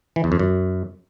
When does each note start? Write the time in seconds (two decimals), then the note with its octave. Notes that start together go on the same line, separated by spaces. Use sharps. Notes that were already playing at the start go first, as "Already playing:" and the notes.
0.16 E3
0.24 E2
0.32 F2
0.39 F#2